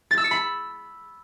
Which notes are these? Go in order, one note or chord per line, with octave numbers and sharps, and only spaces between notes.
A6
E6
C#7
B5